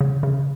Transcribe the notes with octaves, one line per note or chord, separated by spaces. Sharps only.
C#3
C#3